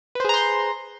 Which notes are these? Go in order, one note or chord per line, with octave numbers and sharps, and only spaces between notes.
G#4 B4 C5 A#5 C6